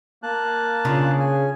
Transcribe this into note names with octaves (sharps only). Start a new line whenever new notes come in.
A#3 A5 F#6
C#3 D4 F4
G#5